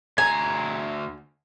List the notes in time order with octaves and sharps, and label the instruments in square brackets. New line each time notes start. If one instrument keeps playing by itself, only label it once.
[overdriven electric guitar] D2 A#5 [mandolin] G#5